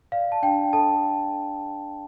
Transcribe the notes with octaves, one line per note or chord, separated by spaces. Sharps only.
D5 F5
A5
D4 G5
A4 A5